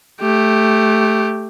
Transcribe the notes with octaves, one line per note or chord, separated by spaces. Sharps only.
A3 G4